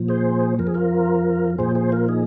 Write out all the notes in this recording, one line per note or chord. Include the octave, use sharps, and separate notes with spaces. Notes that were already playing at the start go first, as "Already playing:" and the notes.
Already playing: A#2 F3
G#4 C5
F2 F3 A#4
G#4
F4 A#4
A#2 F3 G#4 C5
G#4 C5
F4 A#4
D#4 G#4